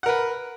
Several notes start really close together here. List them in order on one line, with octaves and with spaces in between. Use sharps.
F#5 A#4 B4